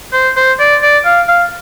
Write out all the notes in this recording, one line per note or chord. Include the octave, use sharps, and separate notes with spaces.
C5
C5
D5
D5
F5
F5